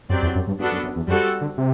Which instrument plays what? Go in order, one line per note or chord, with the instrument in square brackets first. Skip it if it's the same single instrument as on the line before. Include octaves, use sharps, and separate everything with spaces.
[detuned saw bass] F#2 [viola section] F#3 C4 G4 D5
[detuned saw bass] E2
F#2
G2
[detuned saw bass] G2 [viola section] B3 D4 F#4 A4
[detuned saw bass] F#2
F#2
E2
[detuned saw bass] F#2 [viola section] G3 C4 F#4 A4
[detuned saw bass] D3
C3